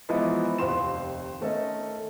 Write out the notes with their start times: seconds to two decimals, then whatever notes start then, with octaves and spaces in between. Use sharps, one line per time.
0.09 E3 F3 G#3 B3 D#4 E4
0.58 F1 D#2 C4 C5 C6 E7
1.41 D#3 A3 C#4 A4 D#5